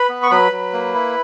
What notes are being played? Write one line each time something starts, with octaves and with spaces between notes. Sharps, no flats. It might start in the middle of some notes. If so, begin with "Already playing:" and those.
Already playing: B4 B5
B3
C#6
F#3 B4 B5
F#3
A#3
E4